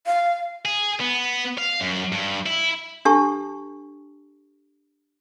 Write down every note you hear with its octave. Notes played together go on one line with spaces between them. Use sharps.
F5
G#4
B3
F5
F#2
G2
E4
D4 G4 A4 A5 C#6